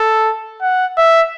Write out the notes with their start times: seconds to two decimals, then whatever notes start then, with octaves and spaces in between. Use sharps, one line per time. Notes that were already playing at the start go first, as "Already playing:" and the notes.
Already playing: A4
0.62 F#5
0.97 E5